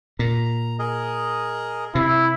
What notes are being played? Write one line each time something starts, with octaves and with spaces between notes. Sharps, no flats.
A#2 A#5
G#4 A#4 D#5
C3 E4